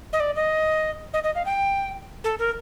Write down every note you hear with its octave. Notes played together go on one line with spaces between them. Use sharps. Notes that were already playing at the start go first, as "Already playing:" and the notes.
D#5
D5
D#5
D#5
D#5
F5
G5
A4
A#4